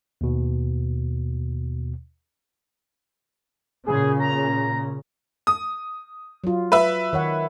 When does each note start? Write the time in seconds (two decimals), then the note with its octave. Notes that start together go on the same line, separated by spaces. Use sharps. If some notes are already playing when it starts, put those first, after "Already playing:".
0.21 D#2 B2
3.86 A#2 C#3 G#4
4.20 A#5
5.47 D#6
6.44 F#3 F4
6.72 B4 E5
7.13 D#3 C#5 F#5